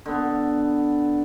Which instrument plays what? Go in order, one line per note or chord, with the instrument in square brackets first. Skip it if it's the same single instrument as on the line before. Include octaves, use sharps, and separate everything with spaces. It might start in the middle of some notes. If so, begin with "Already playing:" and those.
[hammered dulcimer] D3 B3